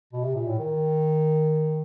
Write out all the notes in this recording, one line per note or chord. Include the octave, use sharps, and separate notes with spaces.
B2
C3
A#2
A2
D#3